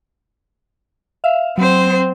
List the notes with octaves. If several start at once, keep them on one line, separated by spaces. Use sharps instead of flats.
E5 F5
F#3 C4 C5